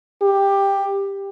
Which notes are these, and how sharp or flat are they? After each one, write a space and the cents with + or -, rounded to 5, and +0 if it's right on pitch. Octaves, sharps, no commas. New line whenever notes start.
G4 +10